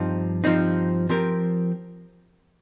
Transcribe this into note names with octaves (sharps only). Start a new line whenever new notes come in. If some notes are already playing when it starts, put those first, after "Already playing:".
Already playing: G2 F3 C4 D#4
G2 F3 C4 D#4
F3 C4 G4 A#4